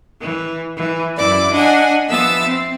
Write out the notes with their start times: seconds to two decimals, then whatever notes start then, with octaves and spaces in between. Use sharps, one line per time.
0.20 E3
0.77 E3
1.17 F#2 E4 D5 D6
1.52 D4 D#5 F#5 G#5
2.09 F3 B3 E5 E6 A6
2.46 C4